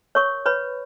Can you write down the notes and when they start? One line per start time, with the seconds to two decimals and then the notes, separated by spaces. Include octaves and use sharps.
0.15 A#4 C#5 C#6
0.45 B4 C#5 B5